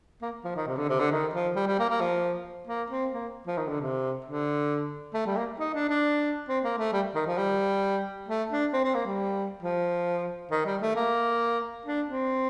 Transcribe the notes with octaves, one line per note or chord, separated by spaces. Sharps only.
A#3
F3
D#3
C3
D3
C3
D3
D#3
F3
G3
G3
A#3
A#3
F3
A#3
C4
A#3
F3
D#3
D3
C3
D3
A3
G3
A#3
D#4
D4
D4
C4
A#3
A3
G3
D#3
F3
G3
A3
D4
C4
C4
A#3
G3
F3
D#3
G3
A3
A#3
D4
C4